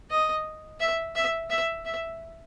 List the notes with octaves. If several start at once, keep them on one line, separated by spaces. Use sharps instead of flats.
D#5
E5
E5
E5
E5